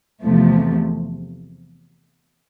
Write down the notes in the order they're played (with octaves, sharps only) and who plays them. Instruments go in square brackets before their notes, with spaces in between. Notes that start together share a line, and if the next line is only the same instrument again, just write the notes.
[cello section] E2 C3 F3 A3